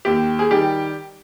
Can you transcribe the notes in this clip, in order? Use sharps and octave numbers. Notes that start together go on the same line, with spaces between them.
D#2 G4
G#4
D#3 G3 G4